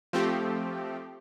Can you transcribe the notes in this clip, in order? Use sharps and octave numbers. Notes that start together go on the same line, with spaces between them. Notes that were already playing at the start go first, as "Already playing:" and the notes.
F3 A3 C4 G4